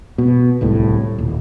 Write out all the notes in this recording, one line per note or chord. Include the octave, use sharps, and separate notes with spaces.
B2
D1 C2 A2
D#1